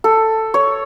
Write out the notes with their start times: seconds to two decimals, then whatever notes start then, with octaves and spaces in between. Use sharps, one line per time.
0.04 A4
0.54 C#5